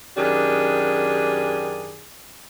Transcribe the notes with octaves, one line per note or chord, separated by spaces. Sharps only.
F#2 D#3 D4 G4 G#4